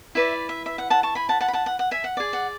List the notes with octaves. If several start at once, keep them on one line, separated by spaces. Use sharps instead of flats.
E4 B4 D5 E5
E5
E5
F#5
F#5 A5
A5 C#6
G#5 B5
F#5 A5
F#5 A5
B5
F#5 A5
F#5
F#5
E5 G#5
F#5
G#4 D5
F#5